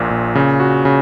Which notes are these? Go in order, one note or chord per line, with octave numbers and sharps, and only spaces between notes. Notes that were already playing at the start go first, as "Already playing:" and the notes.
Already playing: A#1 A#2
A#2
C#3
F#4
C#3